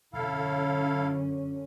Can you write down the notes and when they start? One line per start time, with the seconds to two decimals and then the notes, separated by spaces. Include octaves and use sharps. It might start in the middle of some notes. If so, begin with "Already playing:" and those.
0.13 E1 F#2 D3 C#4 E4 A4 F5